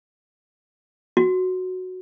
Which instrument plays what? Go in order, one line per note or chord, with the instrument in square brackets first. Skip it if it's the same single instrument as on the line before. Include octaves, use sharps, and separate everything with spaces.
[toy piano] F#4